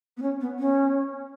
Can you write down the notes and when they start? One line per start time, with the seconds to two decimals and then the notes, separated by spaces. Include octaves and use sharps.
0.17 B3
0.22 C#4
0.40 B3
0.59 C#4